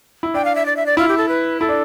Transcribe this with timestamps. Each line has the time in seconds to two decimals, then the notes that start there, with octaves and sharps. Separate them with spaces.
0.23 E4
0.34 D4 G5
0.45 F5
0.55 E5
0.66 D5
0.77 E5
0.86 D5
0.97 E4 F4
1.08 G4
1.18 A4
1.29 B4
1.60 E4 A4
1.69 D4